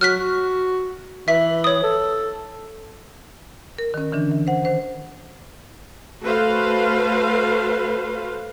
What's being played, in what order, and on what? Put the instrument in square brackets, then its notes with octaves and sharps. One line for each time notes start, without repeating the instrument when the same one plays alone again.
[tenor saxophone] F#3 [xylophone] F6 F#6 B6
[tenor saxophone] F#4
[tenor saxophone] E3 [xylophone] E5 B6
[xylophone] C#5 D#6
[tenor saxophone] A4
[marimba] A#4
D#3 C#4
D3 E3 D4
E3
C5 F#5
D#3 C5
[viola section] A3 F#4 A4 B4 C5 F5